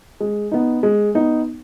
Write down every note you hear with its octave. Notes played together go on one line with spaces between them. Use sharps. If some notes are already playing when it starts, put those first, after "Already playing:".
G#3
B3 D#4
G#3
B3 D#4